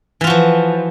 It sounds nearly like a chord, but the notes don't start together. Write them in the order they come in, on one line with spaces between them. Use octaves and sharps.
E3 F4 F#4 F3